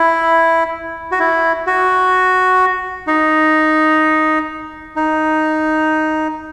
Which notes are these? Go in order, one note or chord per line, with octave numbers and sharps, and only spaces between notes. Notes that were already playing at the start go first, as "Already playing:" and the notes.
Already playing: E4
F#4
E4
F#4
D#4
D#4